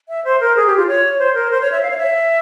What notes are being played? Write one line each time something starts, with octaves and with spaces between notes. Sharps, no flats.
E5
C5
A#4
G#4
G4
F4
C#5
C5
A#4
C5
C#5
E5
F5
C#5
E5